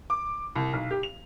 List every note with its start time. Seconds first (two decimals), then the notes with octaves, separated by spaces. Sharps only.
0.10 D6
0.55 C2
0.73 B1
0.91 G4
1.03 F7